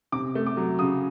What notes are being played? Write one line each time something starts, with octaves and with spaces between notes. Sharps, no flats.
C3 D6
A3
D6
F#3
C#3 D#6